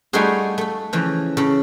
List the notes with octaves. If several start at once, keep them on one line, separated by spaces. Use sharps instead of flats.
G3 A3 D#4 F4 F#4 G#4
A3 A4
C#3 E3 F3
C#3 A4